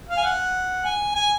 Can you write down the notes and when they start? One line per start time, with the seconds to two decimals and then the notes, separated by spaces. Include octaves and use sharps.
0.09 F5
0.17 G#5
0.24 F#5
0.85 G#5
1.15 G#5